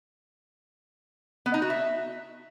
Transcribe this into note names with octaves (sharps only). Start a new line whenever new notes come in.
B3
D#4
F#4
E5